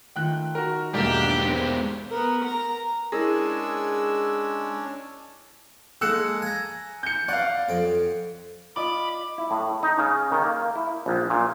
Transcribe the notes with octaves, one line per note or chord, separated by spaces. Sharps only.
D#3 A3 F4 G5 F#6
F#4 A#4
E1 B1 G#2 A#3 D4 G4 E5
G#3 B3 A#4 C5 D5
B3 A#4
A#4 A#5
G#3 C#4 D4 E4 G#4 A#4 E6
G#3 A#3 A4 E6 F#6 C#7
G#5 A#5
G6 C#7
D5 F5 F#5
F2 G5
F4 D5 D#5 B5 D6
E4
A2
D#4
C#3
D#3
A#3
E4
A#1
A#2